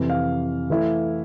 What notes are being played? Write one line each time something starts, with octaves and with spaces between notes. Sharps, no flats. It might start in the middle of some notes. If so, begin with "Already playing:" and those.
Already playing: F2 C3 E3
F5
E3 A3 E4